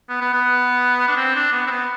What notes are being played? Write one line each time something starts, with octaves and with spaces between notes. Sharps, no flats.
B3
B3
B3
D4
C4
D4
B3
C4
B3